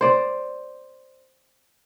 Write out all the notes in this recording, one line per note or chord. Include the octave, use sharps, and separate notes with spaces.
C5 D5